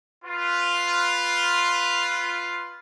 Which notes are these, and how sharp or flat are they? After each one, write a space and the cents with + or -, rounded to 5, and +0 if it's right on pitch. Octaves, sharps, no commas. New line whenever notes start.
F4 +0 B4 +0